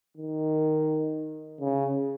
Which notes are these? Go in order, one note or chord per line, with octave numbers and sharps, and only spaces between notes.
D#3
C#3